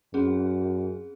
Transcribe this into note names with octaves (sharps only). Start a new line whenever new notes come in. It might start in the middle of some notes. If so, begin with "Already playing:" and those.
F#2 C4 C#4 G#4